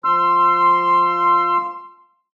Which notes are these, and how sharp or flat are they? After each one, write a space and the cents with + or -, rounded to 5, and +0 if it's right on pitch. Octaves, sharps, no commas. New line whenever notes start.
F3 +0 C6 +0 E6 +35